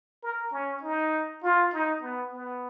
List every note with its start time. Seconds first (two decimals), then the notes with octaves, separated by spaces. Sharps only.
0.23 A#4
0.53 C#4
0.83 D#4
1.43 F4
1.73 D#4
2.02 B3
2.32 B3